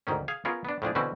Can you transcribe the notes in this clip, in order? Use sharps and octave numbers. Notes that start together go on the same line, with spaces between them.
D2 G#2 D#3 C#4
G#4 F5 G#5
B3 C#4 F4 G#4 A#4 C#5
B3 D4
A2 F3 D4 G#4
B2 D3 E3 C4 C#4 F#4